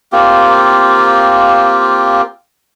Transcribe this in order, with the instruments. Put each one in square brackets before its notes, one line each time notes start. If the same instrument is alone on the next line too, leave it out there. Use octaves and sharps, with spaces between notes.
[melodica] A#3 C4 F4 G4